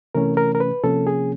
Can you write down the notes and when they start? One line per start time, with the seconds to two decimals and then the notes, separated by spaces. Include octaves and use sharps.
0.15 C3 E3 A3 C#4 A#4
0.37 A#4
0.55 A#4
0.60 B4
0.83 C3 F3 A#3 C#4 A4
1.07 G#4